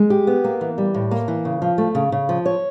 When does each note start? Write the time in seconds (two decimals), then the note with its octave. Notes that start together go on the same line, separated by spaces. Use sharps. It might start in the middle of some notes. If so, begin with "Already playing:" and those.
Already playing: G#3
0.10 G4
0.27 B3
0.44 A#3
0.61 E3
0.78 G3
0.94 A2
1.11 A#3
1.28 E3
1.45 C#3
1.62 F3
1.78 A3
1.95 C#3
2.12 C#3
2.29 F3
2.46 C#5